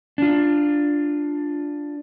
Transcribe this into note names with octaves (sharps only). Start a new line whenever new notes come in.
D4 F4